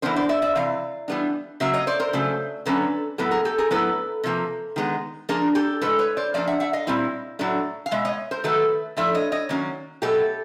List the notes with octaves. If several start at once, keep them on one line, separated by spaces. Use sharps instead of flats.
E3 G3 B3 D4 A#4 C5
C5 D5
D5 E5
D5 E5
C3 E3 F5
E3 G3 B3 D4
C#3 F#3 A#3 E5
C#5 D#5
C5 D5
A#4 C5
C#3 F#3 A3
D3 F#3 A#3 C#4 A4 B4
A2 F#3 B3 A4 B4
G#4 A#4
G4 A4
G#4 A#4
A2 F#3 B3 E4 A4 B4
C3 F3 A#3
D#3 G#3 B3
F3 A#3 D4 G#4 A#4
G4 A4
A2 F3 G#3 A4 B4
B4 C#5
C5 D5
F3 A#3 D4 D5 E5
E5 F#5
E5 F#5
D#5 F5
A#2 G3 C4 E4
A2 F#3 A3 D4
F5
B2 G#3 E5
C#5 D#5
A#4 C5
D#3 F#3 A3 A4 B4
A2 F3 A3 D4 D5 E5
C#5 D#5
C#5 D#5
D#3 F#3 A#3 C#4
B2 F#3 A3 G4 A4